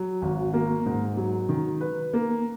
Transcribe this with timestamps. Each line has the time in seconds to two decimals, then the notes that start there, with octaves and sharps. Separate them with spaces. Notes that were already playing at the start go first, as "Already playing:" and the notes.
Already playing: F#3
0.22 G#1
0.53 A#3
0.86 G#2
1.17 F#3
1.49 D#3
1.81 B4
2.13 A#3